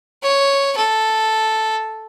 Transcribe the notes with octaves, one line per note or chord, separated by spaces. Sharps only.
C#5
A4